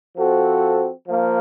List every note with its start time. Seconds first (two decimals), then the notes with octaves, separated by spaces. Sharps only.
0.16 F3 C4 F#4 A4
1.08 F3 A#3